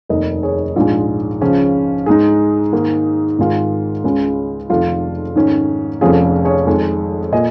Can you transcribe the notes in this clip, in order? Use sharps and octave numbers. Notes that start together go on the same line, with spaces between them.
F1 D#2 D#3 A#4 D#5
G#4 C#5
A#1 G#2 G#3 F4
C#2 C#3 F3 C#4
G#2 G#3 D#4 G#4
G#2 D#3 A#3 D#4
G#1 G#2 D#3 G#3 F4
C#2 C#3 G#3 F4
F1 F2 D#3 F4
G#2 D#3 C#4
F1 F2 F3 C#4 F4 G#4
G#4
G#4 C#5
F2 D#3 G#3
A#2 A#3 F4 D#5 G#5